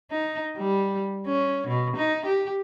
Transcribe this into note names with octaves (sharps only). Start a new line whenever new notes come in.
D#4
G3
C#4
B2
D#4
G4